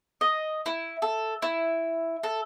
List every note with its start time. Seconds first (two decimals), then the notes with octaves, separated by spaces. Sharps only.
0.21 D#5
0.66 E4
1.02 A4
1.42 E4
2.23 A4